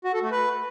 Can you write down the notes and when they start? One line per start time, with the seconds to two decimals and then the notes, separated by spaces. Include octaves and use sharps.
0.04 F#4
0.13 A4
0.22 A3
0.31 B4